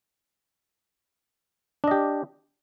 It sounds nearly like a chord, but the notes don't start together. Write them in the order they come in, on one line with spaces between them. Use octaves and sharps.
D4 D#5 G4